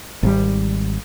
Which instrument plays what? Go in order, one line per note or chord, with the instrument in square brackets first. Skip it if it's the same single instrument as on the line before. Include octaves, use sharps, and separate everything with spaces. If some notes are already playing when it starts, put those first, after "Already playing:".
[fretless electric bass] G#1 G3